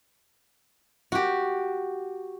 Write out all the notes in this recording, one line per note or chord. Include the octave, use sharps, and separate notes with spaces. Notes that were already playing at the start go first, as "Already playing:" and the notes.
F#4 G4